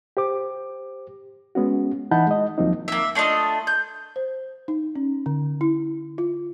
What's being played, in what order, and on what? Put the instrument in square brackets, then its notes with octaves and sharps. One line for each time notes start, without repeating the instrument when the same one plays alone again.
[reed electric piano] G4 C5 D6
G#3 B3 C#4 F#4
E3 D#4 F#5 A5 B5 G6
G#3 D#5
D#2 F3 F#3 A#3 C4 D#4
[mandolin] A#3 E5
A3 D4 F4 D#5
G6
[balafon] C5
D#4
C#4
D3
E4
F4